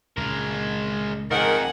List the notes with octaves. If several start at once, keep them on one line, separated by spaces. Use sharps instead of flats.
C#2 A#2 G#3 A#4
F2 G#2 D#3 D#4 A#4 F#5 G#5